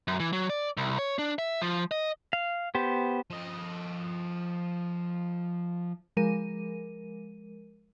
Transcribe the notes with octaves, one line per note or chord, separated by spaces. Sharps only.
F#2
E3
F#3
D5
C2
C#5
D4
E5
F3
D#5
F5
B3 G4 C5
F3 D#5
F3 G#3 A#4 D#7